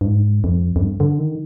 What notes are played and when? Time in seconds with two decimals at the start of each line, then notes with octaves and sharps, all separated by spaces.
0.01 G2
0.07 G#2
0.44 F2
0.76 F2
0.81 G2
1.00 D3
1.19 D#3